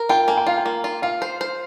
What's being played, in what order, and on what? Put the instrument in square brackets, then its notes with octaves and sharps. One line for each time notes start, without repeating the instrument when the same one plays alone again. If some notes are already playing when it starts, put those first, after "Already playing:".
Already playing: [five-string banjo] A#4
[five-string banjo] F4 [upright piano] G5
[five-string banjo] A#3 [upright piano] G#5
[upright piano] G5
[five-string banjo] F4 [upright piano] F5
[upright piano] G5
[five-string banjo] A#3
F4
[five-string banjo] F4 [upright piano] F5
[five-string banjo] C5
C5